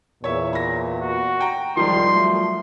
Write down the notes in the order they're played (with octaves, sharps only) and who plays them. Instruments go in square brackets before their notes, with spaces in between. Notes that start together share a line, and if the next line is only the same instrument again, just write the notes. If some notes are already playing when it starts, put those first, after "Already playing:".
[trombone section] E2 A#2 [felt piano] C#5 E5
[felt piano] B5 A#6
[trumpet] F#4
[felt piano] G5 A#5
[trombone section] C2 G#2 D#3 [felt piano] F3 G3 [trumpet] C6
[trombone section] F#3 A3